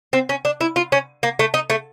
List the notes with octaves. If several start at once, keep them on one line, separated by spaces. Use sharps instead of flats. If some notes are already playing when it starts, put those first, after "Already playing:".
C4
C#4
D4
E4
F4
C#4
A#3
A3
D#4
A3